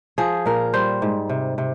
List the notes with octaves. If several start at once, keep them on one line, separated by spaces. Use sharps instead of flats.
F3 G#4
A#2 A#4
G3 C5
G#2
C3
C3